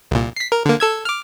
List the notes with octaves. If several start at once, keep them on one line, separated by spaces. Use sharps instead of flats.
C2 A#2
B6 C7
A#4
D3 A#3
A4 E6 G#6
D6 F6